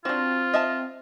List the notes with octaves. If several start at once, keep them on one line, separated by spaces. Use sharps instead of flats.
C4 D4 F4 F#4
D#5 E5 A5